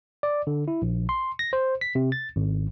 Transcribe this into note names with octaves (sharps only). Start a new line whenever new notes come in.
D5
D3
E4
A#1
C6
A#6
C5
B6
C3
A6
G#1